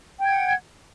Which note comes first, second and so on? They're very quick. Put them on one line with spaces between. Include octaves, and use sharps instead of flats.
G5 G#6 F#5